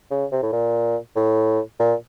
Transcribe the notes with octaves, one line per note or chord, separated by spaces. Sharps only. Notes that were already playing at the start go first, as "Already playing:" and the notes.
C#3
C3
A2
A#2
A2
A#2